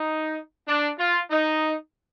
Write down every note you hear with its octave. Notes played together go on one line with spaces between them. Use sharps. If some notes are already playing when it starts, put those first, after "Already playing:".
Already playing: D#4
D4
F4
D#4